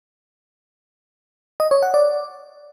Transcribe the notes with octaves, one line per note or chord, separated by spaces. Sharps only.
D#5
C#5
F#5
D5